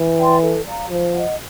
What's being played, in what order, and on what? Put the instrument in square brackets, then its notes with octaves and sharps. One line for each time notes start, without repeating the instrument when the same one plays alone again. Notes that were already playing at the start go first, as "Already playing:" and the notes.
Already playing: [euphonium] E3
[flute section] D5 G5 C6
A4
D5 F5 A#5
[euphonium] F3 [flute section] C5
[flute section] D#5 F#5